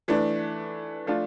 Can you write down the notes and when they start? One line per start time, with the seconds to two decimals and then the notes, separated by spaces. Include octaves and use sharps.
0.08 E3 A3 D4
1.06 F3 A3 D4 F4